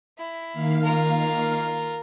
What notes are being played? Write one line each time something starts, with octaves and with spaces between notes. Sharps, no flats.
E4
D#3 A#3 F5
F4 A#4